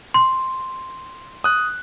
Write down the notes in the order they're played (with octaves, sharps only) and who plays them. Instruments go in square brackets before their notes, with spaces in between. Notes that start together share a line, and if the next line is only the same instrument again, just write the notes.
[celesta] C6
[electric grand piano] D#6 F#6